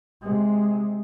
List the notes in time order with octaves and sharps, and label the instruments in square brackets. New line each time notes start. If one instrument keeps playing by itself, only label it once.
[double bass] C3 G#3